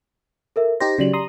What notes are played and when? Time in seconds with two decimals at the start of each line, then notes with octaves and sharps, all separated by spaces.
0.56 A4 A#4 E5
0.80 D#4 G4 C5 A#6
0.98 C#3 F#3 G4 D5 F#7
1.13 A#5 C6 D#6